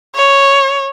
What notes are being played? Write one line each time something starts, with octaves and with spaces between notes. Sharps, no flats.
C#5